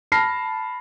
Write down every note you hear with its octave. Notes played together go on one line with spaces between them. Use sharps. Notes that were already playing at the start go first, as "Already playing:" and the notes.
A5 B5 F6 A#6 C7